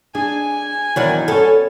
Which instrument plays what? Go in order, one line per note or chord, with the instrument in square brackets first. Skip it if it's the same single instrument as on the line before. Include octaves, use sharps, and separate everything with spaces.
[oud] D4 [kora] G#4 [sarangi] G#5
[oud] E2 D#3 D4 [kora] F#3
[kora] B3 C#4 [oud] A4